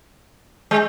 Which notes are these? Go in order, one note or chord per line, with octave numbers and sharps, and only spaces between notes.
G#3